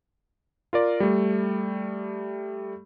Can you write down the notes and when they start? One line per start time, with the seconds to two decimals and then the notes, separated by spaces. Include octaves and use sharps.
0.73 F4 A#4 D5
1.00 G3 A3